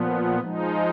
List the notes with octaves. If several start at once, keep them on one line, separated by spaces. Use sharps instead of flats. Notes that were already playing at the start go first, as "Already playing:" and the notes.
Already playing: A#2 F3 B3
F3 G#3 D#4